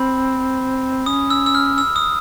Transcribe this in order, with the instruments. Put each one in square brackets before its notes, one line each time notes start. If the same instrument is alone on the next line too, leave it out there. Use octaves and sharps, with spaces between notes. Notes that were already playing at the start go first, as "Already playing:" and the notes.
Already playing: [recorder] C4 [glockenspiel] B5
[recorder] C#4 [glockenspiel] D#6
[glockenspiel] E6
E6
F6
E6
D#6